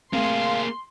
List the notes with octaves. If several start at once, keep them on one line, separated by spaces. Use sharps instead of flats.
A3 A#3 C4 G#4 F5 C6